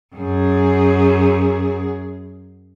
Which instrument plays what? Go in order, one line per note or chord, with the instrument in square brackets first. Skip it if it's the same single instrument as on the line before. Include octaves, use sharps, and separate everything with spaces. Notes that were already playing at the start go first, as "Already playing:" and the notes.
[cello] F#2 G#4